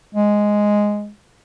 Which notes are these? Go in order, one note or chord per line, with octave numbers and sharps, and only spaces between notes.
G#3